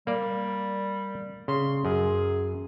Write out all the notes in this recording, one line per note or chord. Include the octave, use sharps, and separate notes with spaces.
G3 A#3 D5
C#3 C6
F#2 G#4